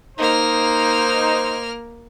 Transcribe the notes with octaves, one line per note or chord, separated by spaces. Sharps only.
A#3 D#4 C5 F6